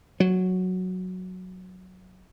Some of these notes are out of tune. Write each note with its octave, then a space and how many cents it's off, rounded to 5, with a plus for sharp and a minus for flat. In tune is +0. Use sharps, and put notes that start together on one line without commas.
F#3 -5